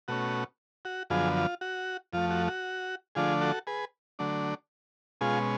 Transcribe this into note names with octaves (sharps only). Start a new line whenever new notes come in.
B2 A3 C#4 F#4
F#4
F#2 D3 F3 B3 F4 G#4
F4
F#4
F2 F3 A3 F4
F#4
F#4
D3 F3 A3 D4 F4 G#4
F#4 A4
G#4 B4
D3 F#3 A3 D4
B2 G#3 C#4 F4 G#4